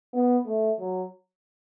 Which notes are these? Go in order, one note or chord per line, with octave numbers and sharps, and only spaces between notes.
B3
A3
F#3